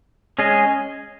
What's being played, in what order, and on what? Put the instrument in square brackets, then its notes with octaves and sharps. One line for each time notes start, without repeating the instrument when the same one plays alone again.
[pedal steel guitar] G#3 C#4 G#4 D#5